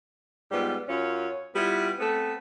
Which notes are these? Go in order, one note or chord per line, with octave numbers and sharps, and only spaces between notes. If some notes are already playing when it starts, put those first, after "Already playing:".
G#2 G3 B3 F4
F#2 C#4 F4 C#5
G3 B3 E4 F4
A3 B3 C4 A4